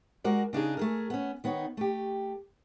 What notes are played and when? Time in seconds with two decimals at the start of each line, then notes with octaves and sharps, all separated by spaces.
0.24 G#3 F#4 A#4 D5
0.53 C#3 D4 D#4 G#4
0.77 A3 G#4 A#4
1.10 B3 C#4
1.44 D#3 B3 D#4 C#5
1.77 A3 G4